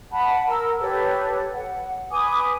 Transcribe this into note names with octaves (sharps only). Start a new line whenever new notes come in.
F#5 A5 B5
A#4 E6
G4 A4 B4 C#5
F#5
B4 G#5 D6 D#6